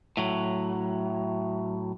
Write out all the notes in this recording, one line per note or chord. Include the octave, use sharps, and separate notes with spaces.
A2 F#3